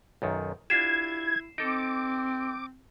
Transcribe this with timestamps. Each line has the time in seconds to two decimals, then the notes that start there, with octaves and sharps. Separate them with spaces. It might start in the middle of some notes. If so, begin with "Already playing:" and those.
0.22 B1 F#2 D#3
0.70 D4 E4 F4 G4 G#6 C7 E7
1.58 C4 D#4 A4 D6